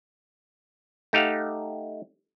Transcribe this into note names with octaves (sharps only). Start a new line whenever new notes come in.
A3 D#4 G4 F5 F#5